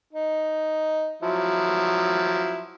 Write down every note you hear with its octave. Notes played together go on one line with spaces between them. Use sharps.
D#4
F3 F#3 E4